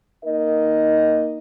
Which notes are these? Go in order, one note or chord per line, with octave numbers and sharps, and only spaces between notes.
A#3 D#4 A#4 D#5